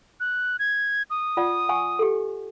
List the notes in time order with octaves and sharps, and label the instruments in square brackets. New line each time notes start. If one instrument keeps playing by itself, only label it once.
[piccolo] F#6
G#6
D#6
[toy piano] F4 D5 F#5
F#5 G#5 C#6
G4 A4